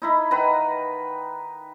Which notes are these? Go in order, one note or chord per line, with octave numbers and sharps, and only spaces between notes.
D#4 E4 B5
D#3 B4 F#5 A#5